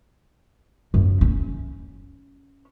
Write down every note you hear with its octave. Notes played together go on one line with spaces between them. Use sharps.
F#2
C#4